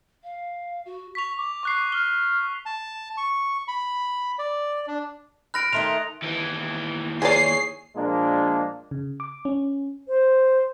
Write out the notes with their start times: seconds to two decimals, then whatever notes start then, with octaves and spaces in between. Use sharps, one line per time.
0.24 F5
0.85 F#4
1.15 C#6 B6 F7
1.37 D6
1.63 C#6 F#6 C7
1.92 F6 G7
2.66 A5
3.17 C#6
3.68 B5
4.39 D5
4.87 D4
5.54 B5 F6 F#6 A#6 D7
5.73 D#3 A3 D#4 C6 F7
6.22 D#2 E3
7.22 G#3 F4 G#4 C#5 D5 C7
7.96 A#2 F3 G#3 A#3 D4
8.91 C#3
9.20 D6
9.45 C#4
10.08 C5